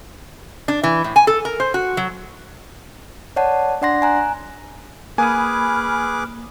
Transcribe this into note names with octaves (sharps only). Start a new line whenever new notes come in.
D4
E3
A2
G#5
A4
A#4
C5
F#4
F#3
C#5 D5 F#5 A5
D4 D5 F#5 C6 A#6
G#5 A#5 F#6
A#3 G#4 B4 G#5 B5 D6 D#6 F6